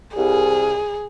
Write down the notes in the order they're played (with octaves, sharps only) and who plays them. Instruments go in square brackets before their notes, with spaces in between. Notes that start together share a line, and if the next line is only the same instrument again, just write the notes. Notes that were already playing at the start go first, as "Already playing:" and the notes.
[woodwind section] C2 [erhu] G#4